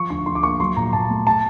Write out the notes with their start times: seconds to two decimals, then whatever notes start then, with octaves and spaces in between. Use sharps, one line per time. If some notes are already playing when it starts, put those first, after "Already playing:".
Already playing: F3 C#6
0.10 D2 C#6
0.26 D2 C6
0.35 D6
0.43 A#3 C#6
0.60 F#3 C6
0.76 A#2 A#5
0.93 A#2 A5
1.10 A3
1.27 A5